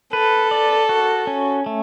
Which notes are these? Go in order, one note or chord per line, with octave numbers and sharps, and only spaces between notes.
A4 B4
D5
F#4
C#4
A3